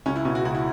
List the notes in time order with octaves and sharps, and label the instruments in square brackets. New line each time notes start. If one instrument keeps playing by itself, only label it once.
[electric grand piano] C#2 [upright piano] C#4
[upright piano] E4
[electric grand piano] B2 [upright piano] C#4
[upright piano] F#4
[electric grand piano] C#2 [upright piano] F#4
[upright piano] E4